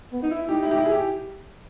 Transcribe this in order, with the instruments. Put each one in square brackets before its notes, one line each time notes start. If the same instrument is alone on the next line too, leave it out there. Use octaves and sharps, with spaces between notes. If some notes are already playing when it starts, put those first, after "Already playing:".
[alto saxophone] B3
D#4
E4
[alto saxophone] D#4 [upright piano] G4
[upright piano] E4
G4
E4
G#4
G4